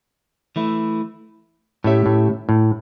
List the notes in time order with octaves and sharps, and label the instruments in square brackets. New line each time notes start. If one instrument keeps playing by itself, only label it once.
[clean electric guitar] E3 A3 E4
[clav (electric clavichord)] A2 [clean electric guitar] A3 C#4 G4 C#5 E5
[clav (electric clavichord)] A2
A2